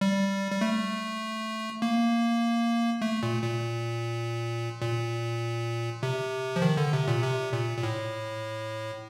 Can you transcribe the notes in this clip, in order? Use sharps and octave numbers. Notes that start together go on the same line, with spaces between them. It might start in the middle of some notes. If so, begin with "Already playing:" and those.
G3
G3
A3
A#3
A3
A#2
A#2
A#2
C3
F3
D#3
D3
C3
A#2
C3
A#2
A#2
A2